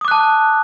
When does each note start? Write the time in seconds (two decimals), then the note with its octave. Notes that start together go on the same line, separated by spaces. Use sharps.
0.01 D#6
0.05 D6
0.08 F#6
0.11 A5